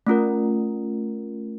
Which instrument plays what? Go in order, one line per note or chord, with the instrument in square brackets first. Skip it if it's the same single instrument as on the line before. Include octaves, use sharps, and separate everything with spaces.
[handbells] A3 C#4 F4 A#4